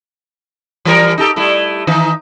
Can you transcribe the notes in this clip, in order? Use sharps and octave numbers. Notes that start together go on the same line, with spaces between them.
E3 G3 A#4
D#4 G4 A4
G3 A3 E4
D#3 E3 D#4